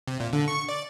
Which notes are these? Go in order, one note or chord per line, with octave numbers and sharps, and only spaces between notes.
C3
A#2
D3
C#6
D5